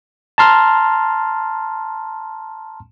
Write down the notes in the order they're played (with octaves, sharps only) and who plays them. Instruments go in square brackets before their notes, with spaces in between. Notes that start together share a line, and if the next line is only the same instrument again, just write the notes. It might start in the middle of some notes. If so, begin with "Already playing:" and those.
[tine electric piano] A5 A#5 C6 F6